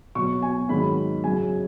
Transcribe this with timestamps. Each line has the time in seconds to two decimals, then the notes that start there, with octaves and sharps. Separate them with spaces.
0.15 B2 F#3 C#6
0.42 G#5
0.69 G#2 D#3 F#3 B5
1.24 F#2 C#3 F#3 G#5